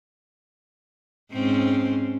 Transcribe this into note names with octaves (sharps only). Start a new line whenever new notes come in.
G#2 C4 C#4